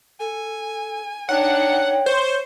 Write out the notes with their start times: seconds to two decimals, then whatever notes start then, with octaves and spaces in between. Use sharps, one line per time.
0.20 A4 G#5
1.29 D4 D#4 C#5 F#5 G5
2.06 C5 C#6